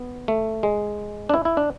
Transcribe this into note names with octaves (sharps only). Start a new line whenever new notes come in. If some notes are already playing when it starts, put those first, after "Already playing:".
Already playing: B3
A3
G#3
D4
E4
E4
D4